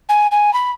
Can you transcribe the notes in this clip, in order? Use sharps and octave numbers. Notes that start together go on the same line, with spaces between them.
G#5
G#5
B5